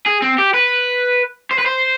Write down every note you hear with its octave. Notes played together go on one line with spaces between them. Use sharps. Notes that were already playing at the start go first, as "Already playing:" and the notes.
G#4
C4
G4
B4
C5
B4
C5